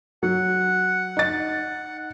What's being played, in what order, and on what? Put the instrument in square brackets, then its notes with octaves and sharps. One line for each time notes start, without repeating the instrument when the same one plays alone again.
[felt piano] F#3 [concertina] F#5
[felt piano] D#4 A6